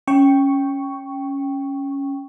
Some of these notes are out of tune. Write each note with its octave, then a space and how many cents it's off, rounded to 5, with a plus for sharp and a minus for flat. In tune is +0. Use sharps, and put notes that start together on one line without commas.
C#4 +0 G5 +0 C#6 +0